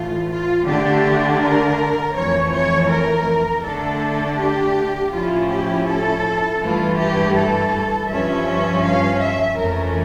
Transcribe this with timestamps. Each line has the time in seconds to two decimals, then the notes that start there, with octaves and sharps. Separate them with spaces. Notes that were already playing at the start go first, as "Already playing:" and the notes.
Already playing: A2 E3 A3 F4
0.30 F4
0.67 D3 A3 D4 G4
1.40 A#4
2.15 F2 E3 A3 C#5
2.53 C#5
2.90 A#4
3.63 D3 A3 D4 A4
4.38 G4
5.12 A2 F3 C#4 E4 F4
5.49 G4
5.86 A4
6.61 G2 E3 A3 F4
6.98 G4
7.35 A4
8.09 G2 F3 C#4 E5
8.83 F5
9.21 E5
9.58 F2 E3 A3 C#4 A#4